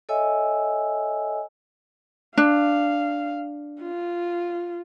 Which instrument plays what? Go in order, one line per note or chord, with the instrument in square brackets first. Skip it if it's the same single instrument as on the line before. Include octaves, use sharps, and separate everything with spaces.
[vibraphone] A4 C#5 D#5 E5 G#5 E6
[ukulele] D4 [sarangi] F5
[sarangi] F4